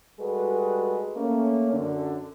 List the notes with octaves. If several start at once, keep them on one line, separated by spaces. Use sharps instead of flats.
G3 G#3 F#4 G#4 A4 B4
A3 A#3 C#4
F#2 D3 D4